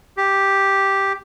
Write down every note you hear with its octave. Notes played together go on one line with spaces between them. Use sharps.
G4